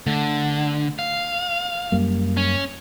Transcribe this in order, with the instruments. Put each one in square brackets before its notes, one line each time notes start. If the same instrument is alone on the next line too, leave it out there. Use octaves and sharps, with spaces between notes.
[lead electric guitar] D3 [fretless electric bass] A3
[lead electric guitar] F5
[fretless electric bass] F#2 G3 A#3
[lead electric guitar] C#4